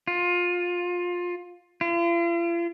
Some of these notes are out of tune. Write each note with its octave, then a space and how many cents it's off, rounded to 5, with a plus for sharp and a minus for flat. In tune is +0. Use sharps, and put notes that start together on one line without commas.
F4 +20
F4 -45